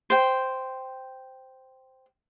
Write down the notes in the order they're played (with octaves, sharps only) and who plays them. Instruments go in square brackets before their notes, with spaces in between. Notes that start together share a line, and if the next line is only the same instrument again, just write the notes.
[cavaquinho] C5 G5